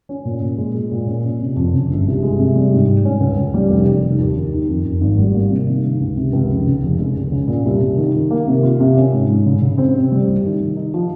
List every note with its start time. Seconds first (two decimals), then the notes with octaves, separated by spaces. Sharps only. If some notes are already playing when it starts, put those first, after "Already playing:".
0.09 C#4
0.25 A#2
0.42 A#2
0.58 G#3
0.75 G#3
0.91 A#2
1.07 C#4
1.23 C#4
1.39 C3
1.56 F2
1.73 C#3
1.90 G1
2.06 C2
2.23 G#3
2.39 C3
2.55 G3
2.72 G#2
2.87 G#2
3.05 C#4
3.20 C#2
3.37 C#2
3.54 G3
3.70 F1
3.86 F1
4.03 D#3
4.19 D#2
4.36 D#2
4.53 D#3
4.69 F2
4.85 F2
5.01 G#1
5.18 G3
5.34 A#3
5.51 C3
5.68 D#3
5.84 D#3
6.00 C#2
6.17 C3
6.33 C#2
6.50 F1
6.67 C#3
6.83 F1
6.98 G#3
7.16 C#2
7.32 C#3
7.48 A#2
7.65 C2
7.82 C2
7.97 D#3
8.14 D#3
8.31 A#3
8.47 C3
8.63 F4
8.80 C3
8.97 C#4
9.13 G#2
9.30 G#2
9.46 C#3
9.61 C#3
9.78 C4
9.94 C3
10.12 G3
10.28 C2
10.44 D#3
10.60 D#3
10.76 D#4
10.94 F3